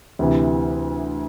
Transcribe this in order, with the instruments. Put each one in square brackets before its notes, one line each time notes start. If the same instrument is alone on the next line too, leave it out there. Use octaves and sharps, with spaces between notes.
[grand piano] D2 C3 E3